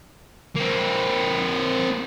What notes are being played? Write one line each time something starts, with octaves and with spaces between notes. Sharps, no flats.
A#3 C4